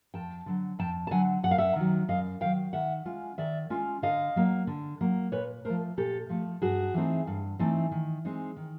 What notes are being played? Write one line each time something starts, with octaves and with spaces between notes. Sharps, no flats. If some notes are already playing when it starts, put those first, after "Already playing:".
F2 G5 A5
D3 F#3
F2 G5 A5
A5
D3 F#3 F#5 G#5
F#2 F#5
F5
E5 F#5
D#3 F#3
F#2 D#5 F5
D#3 F#3 F5 G5
D#3 E5 F#5
G#3 C#4 F4
D#3 D5 E5
G#3 C#4 F4
D3 D#5 F5
F#3 A#3
D3
F#3 A#3
A#2 B4 C#5
F3 A3 A#4 C5
A#2 G4 A4
F3 A3
G2 F#4 G#4
E3 A3 C4 D#4
G2
E3 A3 C4 D#4
D#3
G#3 C4 D#4
D#3